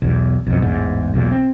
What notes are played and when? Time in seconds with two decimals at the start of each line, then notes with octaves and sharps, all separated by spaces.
0.02 B1 E2
0.47 B1 F2
0.62 A1 E2 G#2
1.14 B1 E2 A#2
1.31 C4